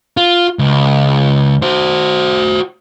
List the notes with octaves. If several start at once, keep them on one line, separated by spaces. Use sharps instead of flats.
F4
C#2
F#4 C5